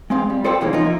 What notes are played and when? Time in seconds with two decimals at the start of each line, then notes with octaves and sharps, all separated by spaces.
0.10 G#3 C4 F5
0.30 G3
0.44 F4 A4 C5 D5 F5 G5
0.61 B2 D#3 E3 G#3 A#3 C#4
0.73 F3 D#4 F4
0.85 A#3 E5